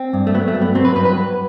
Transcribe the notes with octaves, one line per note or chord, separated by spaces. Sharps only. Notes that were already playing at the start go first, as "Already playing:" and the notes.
Already playing: C4
G2
A3
F#3 B3
A3
G2
B3
F#3 C4
B4
G2 B4
B4
F#3